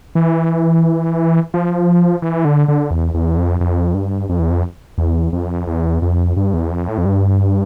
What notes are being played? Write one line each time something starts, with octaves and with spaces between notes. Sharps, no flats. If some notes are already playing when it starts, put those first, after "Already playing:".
E3
F3
E3
D3
D3
E2
E2
F2
F2
G2
F2
E2
F2
E2
F2
E2
F2
G2
E2
F2
A2
F2
G2